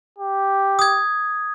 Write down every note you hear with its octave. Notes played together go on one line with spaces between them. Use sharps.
G4
D#6 G#6